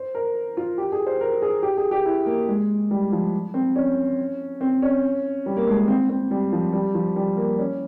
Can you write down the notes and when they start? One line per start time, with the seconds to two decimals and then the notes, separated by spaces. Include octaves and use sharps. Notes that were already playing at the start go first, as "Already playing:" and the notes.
Already playing: C5
0.15 A#4
0.57 F4
0.78 G4
0.92 G#4
1.06 C5
1.21 A#4
1.42 G#4
1.63 G4
1.77 G#4
1.91 G4
2.06 E4
2.26 A#3
2.49 G#3
2.91 G3
3.12 F3
3.54 C4
3.76 C#4
4.61 C4
4.82 C#4
5.46 G3
5.57 A#3
5.67 G#3
5.78 A#3
5.88 C4
6.09 C4
6.31 G3
6.53 F3
6.73 G3
6.95 F3
7.16 G3
7.37 A#3
7.58 C#4